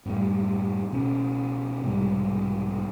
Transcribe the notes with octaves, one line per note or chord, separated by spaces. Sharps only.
F#2 A2 G3
C#2 B2 C#4
B1 G#2 C3 G3